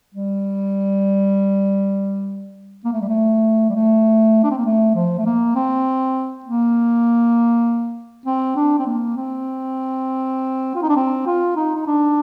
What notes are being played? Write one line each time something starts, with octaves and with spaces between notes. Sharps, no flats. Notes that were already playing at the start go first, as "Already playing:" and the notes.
G3
A#3
A3
G3
A3
G3
A3
D4
C4
A#3
A3
F3
A3
A#3
C4
A#3
C4
D4
C4
A#3
C4
F4
D#4
D4
C4
F4
D#4
D#4
D4